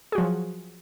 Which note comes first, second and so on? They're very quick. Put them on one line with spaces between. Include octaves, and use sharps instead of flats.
G#4 F#4 F3 F#3